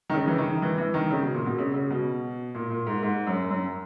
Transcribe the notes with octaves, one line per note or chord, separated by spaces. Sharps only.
D#3
C#3
E3
D#3
E3
E3
D#3
C#3
B2
A#2
B2
C#3
C#3
B2
A#2
A#2
G#2
G#2
F#2
F#2